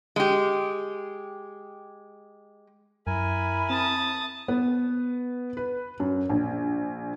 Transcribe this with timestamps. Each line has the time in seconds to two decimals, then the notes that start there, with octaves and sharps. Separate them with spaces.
0.16 G#3 G4
3.07 F#2 E4 A#4 G#5 B5
3.70 C4 A5 D#6
4.48 B3
5.57 B4
6.00 F#2
6.29 A#1